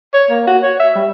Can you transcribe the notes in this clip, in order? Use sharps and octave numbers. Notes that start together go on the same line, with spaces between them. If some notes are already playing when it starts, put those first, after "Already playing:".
C#5
A#3
F#4
C#5
E5
G3